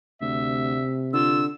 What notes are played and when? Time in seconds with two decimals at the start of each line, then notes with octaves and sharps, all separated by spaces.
0.22 D2 C3 E5
1.13 D3 F4 E6